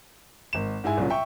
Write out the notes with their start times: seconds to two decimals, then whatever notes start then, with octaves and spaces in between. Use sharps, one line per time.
0.53 G#1 E7
0.84 G#2 G#3 E4 G#5
0.97 C2 A#2 C#3 F#3
1.10 E5 G5 C#6